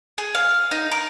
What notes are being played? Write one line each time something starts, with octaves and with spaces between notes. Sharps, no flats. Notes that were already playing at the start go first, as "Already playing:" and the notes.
G#4
F5
D#4
A#4